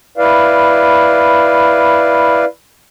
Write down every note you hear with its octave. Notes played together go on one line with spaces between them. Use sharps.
E4 B4 D5 F5